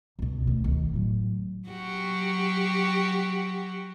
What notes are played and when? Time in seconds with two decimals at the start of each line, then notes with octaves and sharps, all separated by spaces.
0.19 C#2 B2
0.47 D2
0.64 D#3
0.93 A2 F#3
1.69 F#3 F#4 G4